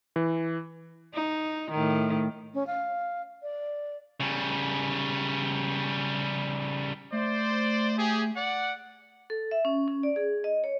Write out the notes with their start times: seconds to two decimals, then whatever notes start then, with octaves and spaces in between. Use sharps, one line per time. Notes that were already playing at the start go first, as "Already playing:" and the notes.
0.16 E3
1.14 D#4
1.71 A2 D#3
2.54 C#4
2.67 F5
3.42 D5
4.20 C#3 G3
7.12 A3 C5 D5
7.98 G4 G#4
8.36 D5 F#5
9.30 A4
9.51 E5
9.65 C#4
9.88 C#4
10.03 D5
10.16 G#4
10.44 D#5
10.64 C#5